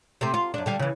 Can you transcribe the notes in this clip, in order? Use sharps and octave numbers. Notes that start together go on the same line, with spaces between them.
C3 A3 C4
F4
F#2 D4
D3 G3 F5
C#3 E3